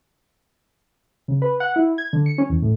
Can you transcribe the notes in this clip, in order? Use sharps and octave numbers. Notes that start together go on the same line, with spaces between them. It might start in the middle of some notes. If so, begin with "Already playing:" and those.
C#3
B4
F#5
E4
G#6
D3
C#7
C#4
E2
A2